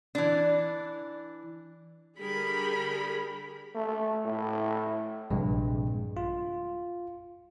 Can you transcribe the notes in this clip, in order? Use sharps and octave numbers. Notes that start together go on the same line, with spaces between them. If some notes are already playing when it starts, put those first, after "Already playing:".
E3 D4
D3 G3 G#4 A#4 B5
A3
A2
A#1 G2 C3 G#3
F4